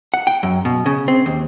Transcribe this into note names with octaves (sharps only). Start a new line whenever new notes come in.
F#5
G5
F#2
B2
C#3
C4
D#2